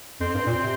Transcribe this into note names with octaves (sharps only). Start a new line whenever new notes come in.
F2 C4
G2
A#2
C3